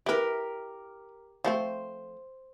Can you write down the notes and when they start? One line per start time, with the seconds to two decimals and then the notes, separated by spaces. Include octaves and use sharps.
0.06 E4 G4 A#4 B4
1.44 F3 A3 C4 C5